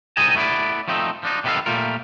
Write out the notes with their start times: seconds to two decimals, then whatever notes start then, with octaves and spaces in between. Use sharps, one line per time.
0.17 C2 C4 D#4 D#5 G#5 A5
0.35 A3 B3 E4 D5
0.88 F3 A3 C4 D#4
1.23 F3 D4 D#4
1.44 C3 D#3 B3 G4 A4 F5
1.66 A#2 G3 A3 F4 A#4